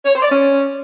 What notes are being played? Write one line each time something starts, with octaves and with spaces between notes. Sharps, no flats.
C#5
C5
D5
C#4